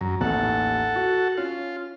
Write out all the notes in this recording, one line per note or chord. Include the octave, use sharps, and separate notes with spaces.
F#2 A#5
A1 D#2 A4 F#5
F#4
C#4 F4